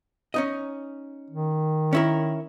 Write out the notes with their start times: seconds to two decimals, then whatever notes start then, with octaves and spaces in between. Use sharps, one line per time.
0.34 C#4 D#4 D#5
1.30 D#3
1.93 C#4 E4 A#4